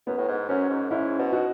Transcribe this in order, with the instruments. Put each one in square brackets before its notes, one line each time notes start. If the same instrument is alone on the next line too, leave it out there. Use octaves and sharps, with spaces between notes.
[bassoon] F#2 [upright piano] B3
[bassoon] A2
G#2
[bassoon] F#2 [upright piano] C#4
[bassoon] G#2
[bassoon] G#2 [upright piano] C#4 E4
[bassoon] B2
[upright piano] D#4 F#4